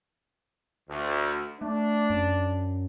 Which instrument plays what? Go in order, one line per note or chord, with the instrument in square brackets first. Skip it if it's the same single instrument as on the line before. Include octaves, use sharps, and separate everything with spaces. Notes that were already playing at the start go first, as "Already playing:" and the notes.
[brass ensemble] D2
[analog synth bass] A3 [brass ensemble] D4
[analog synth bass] F#2